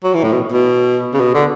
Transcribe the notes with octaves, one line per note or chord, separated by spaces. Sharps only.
F#3
E3
A2
B2
B2
C#3
B2
D3